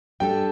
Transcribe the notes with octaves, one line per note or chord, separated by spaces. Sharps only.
G3 D4 A4 G5